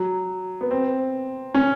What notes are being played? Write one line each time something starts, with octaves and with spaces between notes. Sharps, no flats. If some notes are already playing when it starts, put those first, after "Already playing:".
Already playing: F#3
B3
C4
C#4